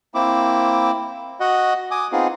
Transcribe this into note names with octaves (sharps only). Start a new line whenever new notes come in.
A#3 C4 E4 D6
F#4 D#5 F#5
G#5 D6 D#6
B3 C4 D#4 F4 G#4